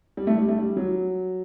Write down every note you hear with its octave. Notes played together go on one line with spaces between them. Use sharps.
G3
A3
G3
A3
G3
F#3